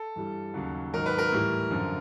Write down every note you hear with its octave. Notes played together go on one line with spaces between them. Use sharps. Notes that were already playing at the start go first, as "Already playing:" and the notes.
Already playing: A4
G2 E3 G3
D#2 C#3 F#3
G#2 D#3 F#3 A#4
B4
A#4
A2 E3 G3
F#2 D3 F3